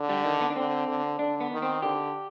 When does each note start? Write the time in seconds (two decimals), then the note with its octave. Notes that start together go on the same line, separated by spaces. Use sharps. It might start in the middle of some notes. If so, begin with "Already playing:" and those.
Already playing: D3
0.09 G3
0.24 D#3
0.41 B3
0.50 D4
0.56 D3 C4
0.87 D3
1.19 D3 D4
1.40 B3
1.51 D#3
1.62 C4
1.82 D3 G4